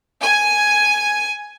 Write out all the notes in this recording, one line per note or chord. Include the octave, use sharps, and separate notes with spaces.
G#5